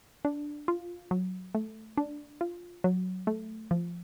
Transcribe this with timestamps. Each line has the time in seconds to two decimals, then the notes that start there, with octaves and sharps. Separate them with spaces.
0.25 D4
0.68 F4
1.11 F#3
1.55 A3
1.97 D4
2.41 F4
2.84 F#3
3.27 A3
3.71 F3